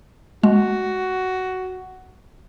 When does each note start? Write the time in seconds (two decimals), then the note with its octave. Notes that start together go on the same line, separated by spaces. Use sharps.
0.43 G#3 F#4